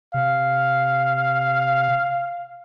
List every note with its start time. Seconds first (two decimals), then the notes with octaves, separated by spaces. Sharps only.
0.14 C3 F5